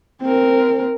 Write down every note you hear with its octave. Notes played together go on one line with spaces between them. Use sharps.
C4 A#4